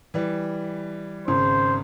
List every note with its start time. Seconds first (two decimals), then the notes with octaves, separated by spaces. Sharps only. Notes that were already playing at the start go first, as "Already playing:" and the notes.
0.14 E3 G3
1.28 G#1 C#3 C5